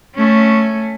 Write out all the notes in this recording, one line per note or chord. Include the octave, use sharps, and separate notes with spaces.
A3 C#4